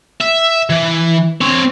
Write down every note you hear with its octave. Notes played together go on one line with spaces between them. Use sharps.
E5
E3
C4 C#5